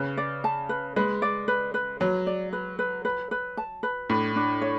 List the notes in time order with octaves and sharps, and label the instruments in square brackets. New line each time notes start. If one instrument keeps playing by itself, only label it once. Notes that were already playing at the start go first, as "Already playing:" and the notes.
Already playing: [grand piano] C#3 [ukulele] B4
[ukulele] D5
A5
B4
[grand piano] G#3 [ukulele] B4
[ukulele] D5
B4
B4
[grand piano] F#3 [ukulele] B4
[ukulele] D5
B4
B4
B4
B4
A5
B4
[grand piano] A2 [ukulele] D4
[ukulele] D4
C#5